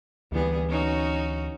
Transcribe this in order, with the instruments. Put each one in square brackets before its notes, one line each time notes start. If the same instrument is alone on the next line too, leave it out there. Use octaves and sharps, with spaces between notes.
[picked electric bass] D2 E3 [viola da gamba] G3 B3 G#4
[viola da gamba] C#4 D#4 F#4